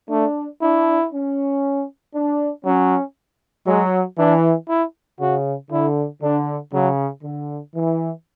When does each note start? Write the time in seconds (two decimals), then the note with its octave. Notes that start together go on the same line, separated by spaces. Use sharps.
0.10 A3 D4
0.62 D4 E4
1.13 C#4
2.15 D4
2.65 F#3 C#4
3.67 F#3 G#3
4.18 E3 D4
4.69 E4
5.20 C#3 F#4
5.71 D3 E4
6.22 D3 D4
6.73 C#3 F#3
7.24 D3
7.75 E3